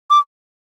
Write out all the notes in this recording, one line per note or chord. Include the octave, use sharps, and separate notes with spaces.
D6